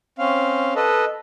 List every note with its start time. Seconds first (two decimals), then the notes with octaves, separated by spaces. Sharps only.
0.18 C4 C#4 F5
0.76 A4 B4 D#5